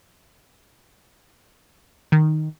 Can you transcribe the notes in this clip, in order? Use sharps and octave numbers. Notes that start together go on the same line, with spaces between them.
D#3